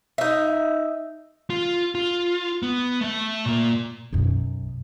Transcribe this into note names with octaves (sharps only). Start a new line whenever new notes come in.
D#4 E5
F4
F4
B3
A3 E5
A#2 A#3
B1 F#2